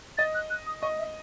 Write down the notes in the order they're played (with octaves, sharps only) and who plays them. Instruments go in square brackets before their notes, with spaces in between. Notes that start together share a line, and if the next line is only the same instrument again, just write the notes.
[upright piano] D#5 [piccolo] A6
[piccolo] F#6
F#6
D#6
[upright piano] D#5 [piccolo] C#6
[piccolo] E5